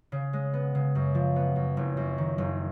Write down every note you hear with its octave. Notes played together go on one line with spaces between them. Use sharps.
C#3
G#3
B3
C#3
F#2
F3
B3
F#2
F#1
F#2
D#3
F#1